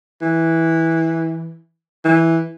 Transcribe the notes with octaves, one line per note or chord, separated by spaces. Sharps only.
E3
E3